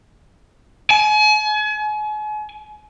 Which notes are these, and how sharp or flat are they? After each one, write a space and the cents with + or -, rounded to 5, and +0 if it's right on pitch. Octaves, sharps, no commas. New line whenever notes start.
G#5 +40